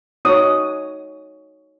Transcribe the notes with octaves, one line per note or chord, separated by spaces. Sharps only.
D#4 F#4 C#5 D#6